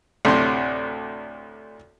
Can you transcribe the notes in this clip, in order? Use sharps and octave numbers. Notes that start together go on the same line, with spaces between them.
D2 A2 C3 C6